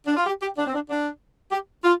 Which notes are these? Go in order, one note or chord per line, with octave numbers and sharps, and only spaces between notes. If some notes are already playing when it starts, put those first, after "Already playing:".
D4
F4
G4
G4
D4
C4
D4
D4
G4
F4